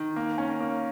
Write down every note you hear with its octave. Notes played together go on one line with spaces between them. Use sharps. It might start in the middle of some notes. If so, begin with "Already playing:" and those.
Already playing: D#3
A#3
C#4
A#3